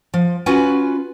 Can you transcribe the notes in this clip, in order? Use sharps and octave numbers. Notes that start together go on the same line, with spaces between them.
F3
C#4 F4 F#4 B4 G#5